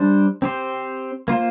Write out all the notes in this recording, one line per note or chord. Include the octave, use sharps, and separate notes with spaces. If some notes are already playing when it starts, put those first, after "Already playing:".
Already playing: G3 D4 C5
C4 G4 C5
A#3 F4 C5